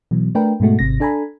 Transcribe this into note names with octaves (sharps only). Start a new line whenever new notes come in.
B2 E3 F#3
A3 D4 A#4 B4 G5
G#2 B2 G#3 A3 F#4
G#1 C3 A#6
D4 A4 G#5 A#5 B5